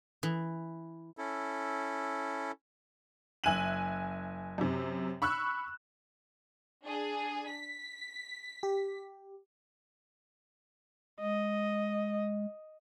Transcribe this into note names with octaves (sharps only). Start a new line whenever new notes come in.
E3
C#4 E4 A4
F#1 E5 G#5 F#6 D#7 F#7
F#2 C3
B5 C#6 E6 F#6
D4 G#4
B6
G4
G#3 D#5